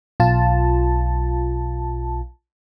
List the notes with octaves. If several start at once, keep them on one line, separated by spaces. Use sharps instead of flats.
B1 F4 A5